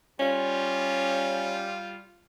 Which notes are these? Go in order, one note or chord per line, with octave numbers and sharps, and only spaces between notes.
G3 C#4 F4